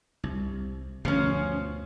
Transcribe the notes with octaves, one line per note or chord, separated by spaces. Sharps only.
C2
D2 G2 B2 F3 C#4